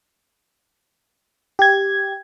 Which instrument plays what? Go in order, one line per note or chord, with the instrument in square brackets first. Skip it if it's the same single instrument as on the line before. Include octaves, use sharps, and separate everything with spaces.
[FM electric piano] G4 G#6